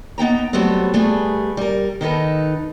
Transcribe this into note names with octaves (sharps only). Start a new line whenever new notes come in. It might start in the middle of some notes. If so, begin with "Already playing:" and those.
B3 D#4 G5 A#5
F#3 G3 A3 B3 C4
G3 A3 B3 G#4
G3 A#4
D#3 D#4 A4 B4